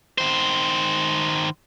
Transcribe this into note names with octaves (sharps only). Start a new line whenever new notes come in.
D#3 C5